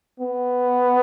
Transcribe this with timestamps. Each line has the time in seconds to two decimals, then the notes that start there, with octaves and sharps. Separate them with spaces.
0.20 B3